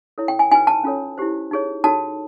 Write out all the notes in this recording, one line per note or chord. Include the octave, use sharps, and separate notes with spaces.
E4 A4 C#5
G5
G#5
D#4 F#4 B4 G#5
A5
C#4 F4 A4 C#5
E4 G4 C5
D#4 G#4 C#5
D#4 F#4 A4 C#5 A5